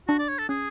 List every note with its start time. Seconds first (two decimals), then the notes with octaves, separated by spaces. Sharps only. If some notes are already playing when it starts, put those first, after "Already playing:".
0.08 D4 F#4
0.19 D5
0.29 C#5
0.39 A4
0.49 C#4 G#4